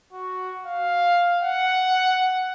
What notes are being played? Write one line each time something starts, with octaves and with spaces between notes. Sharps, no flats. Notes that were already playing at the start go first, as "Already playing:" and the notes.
F#4
F5
F#5